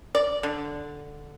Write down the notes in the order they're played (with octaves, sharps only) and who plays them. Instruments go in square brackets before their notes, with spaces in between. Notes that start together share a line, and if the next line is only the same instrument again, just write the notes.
[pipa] D5
D3